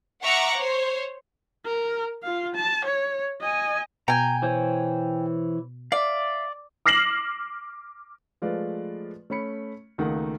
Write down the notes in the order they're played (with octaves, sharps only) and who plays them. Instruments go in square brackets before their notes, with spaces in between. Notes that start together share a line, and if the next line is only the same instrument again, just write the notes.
[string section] E5 F#5 A#5 C#6 D6 F#6
C5 C#5
[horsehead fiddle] A#4
F4 F5
A5
C#5
D#5 G#5
[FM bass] B2 [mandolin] G5 G#5 [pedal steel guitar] A#5
[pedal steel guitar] E3 C5 C#5
[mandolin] D5 [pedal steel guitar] E5 F5
[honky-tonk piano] D6 F6 A#6 C7 E7 F#7
[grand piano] F3 G#3 A3 F4 B4 D5
A3 C#4 B5 C#7
C#2 D#3 A3 A#3 F#5